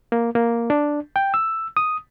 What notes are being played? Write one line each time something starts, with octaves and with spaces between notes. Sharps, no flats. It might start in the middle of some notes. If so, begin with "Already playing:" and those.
A#3
A#3
D4
G5
E6
D#6